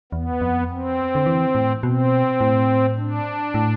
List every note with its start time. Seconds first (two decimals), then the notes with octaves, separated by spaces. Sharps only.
0.12 E2 B3
0.41 F2
0.70 C4
1.15 D3
1.26 E3
1.55 A2
1.83 B2 C4
2.41 A2
2.97 D4
3.54 A2